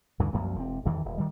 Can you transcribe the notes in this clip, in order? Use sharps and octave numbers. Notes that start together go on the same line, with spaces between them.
D2 G2 C#3 E3
C2 F#2 F3 A#3
E1 A#2 C4
E2 G2 D#3 E3
D#1
D#3 G3